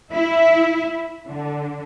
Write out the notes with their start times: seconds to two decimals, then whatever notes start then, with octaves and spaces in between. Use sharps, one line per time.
0.11 E4
1.26 D3